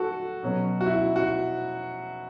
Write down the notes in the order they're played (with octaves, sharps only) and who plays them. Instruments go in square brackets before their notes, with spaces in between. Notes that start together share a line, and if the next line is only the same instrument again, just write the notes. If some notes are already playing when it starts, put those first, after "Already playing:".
Already playing: [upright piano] F#4 A4
B2 F#3 C#4
F#4
E4
F#4